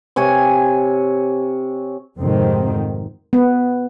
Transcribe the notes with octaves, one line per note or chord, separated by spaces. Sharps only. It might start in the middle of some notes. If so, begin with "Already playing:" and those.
C3 C#5 G#5
F1 F2 G#2 C3 D#3 C4
B3